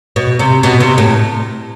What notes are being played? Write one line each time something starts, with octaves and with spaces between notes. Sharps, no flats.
B2
C3
B2
C3
A2